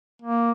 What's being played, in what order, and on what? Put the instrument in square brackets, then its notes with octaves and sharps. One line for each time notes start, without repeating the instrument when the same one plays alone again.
[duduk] A#3